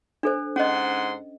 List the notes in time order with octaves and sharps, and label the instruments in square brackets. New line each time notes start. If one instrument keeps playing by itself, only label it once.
[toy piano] D4 A4 C5
[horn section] G#2 F#5 C6 [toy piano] C#4 D#5